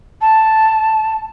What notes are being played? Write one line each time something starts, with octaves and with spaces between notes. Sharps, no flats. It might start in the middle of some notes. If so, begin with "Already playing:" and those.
A5